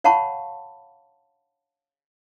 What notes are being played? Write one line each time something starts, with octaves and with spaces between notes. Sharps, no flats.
C#5 F5 F#5 A5 B5 C#6